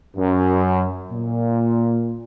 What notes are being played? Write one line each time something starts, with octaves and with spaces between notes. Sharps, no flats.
F#2
A#2